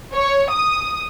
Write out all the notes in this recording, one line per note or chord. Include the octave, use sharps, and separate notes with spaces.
C#5
D#6